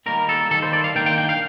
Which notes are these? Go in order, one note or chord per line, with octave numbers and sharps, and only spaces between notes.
D#3 G3 A#3 A#4
A4
D#3 G3 A#3 A4
C5
D5
F5
D#3 A#3 D4 G5
G5
G5
F5